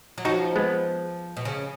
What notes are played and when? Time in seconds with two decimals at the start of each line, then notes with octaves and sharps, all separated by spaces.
0.18 F#3
0.25 F3 D#4 F#4
0.56 G#3 B3
1.37 B2
1.45 C#3